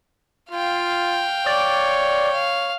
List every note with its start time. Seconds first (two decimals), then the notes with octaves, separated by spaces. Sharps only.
0.51 F4 F5 G5
1.46 C#5 D5
2.33 F5